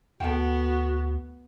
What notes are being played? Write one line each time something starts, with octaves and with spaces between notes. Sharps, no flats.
D2 B3 F#4 A4 G5